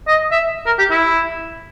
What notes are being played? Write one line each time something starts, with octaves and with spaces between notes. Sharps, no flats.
D#5
E5
A#4
G4
E4